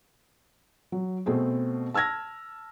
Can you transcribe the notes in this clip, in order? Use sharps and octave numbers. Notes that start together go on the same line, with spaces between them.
F#3
B2 A3 C4 G#4
A5 E6 F6 G#6 A#6